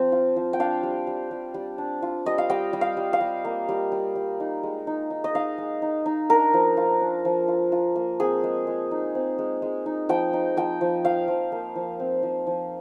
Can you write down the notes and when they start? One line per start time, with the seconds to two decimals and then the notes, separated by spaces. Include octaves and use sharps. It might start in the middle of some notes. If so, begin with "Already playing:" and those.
Already playing: F3 C4
0.12 F4
0.36 F3
0.53 G5
0.60 D4 F5
0.83 G3
1.07 G3
1.31 G3
1.54 G3
1.78 D4
2.02 F4
2.26 G3 D#5
2.38 F5
2.49 G3 G5
2.73 G3
2.81 F5
2.97 G3
3.13 F5
3.21 G3
3.45 A#3
3.69 G3
3.92 G3
4.15 G3
4.40 D#4
4.63 G#3
4.87 D#4
5.11 D#4
5.24 D#5
5.35 D#4 F5
5.58 G#3
5.82 D#4
6.06 D#4
6.29 D4 A#4
6.54 F3
6.77 F4
7.01 D4
7.25 F3
7.48 F4
7.72 F4
7.96 A#3
8.20 C4 G#4
8.44 G#3
8.67 G#3
8.91 D#4
9.15 C4
9.39 G#3
9.62 G#3
9.86 D#4
10.09 F3 G5
10.33 D#4
10.57 F3 G5
10.81 F3
11.05 F3 F5
11.28 F3
11.52 A#3
11.76 F3
12.00 C4
12.23 F3
12.47 F3